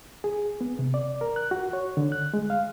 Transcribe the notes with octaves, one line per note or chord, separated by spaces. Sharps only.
G#4
B3
C3
D5
A#4
F#6
F#4
C#5
D3
F#6
G#3
F5